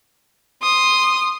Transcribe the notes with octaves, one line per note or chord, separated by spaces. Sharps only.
C6 D#6